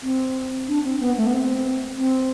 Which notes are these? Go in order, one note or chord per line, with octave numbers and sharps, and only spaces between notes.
C4
D4
C4
B3
A3
B3
C4
C4